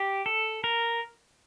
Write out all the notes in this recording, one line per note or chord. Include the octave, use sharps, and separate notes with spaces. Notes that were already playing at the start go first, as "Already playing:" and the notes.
Already playing: G4
A4
A#4